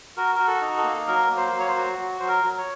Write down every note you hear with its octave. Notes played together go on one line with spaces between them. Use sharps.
F#4 A#4
F#4 A#4
A4
D#4
A4
A#3
F#3 A#4
A#3
C5
F#3
C#5
C5
F#4
F#3
F#3 C5
A#4
F#3
C#5